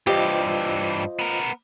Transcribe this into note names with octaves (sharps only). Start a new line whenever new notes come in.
G2 E3 F4 G4 C5 D#5
B3 A#4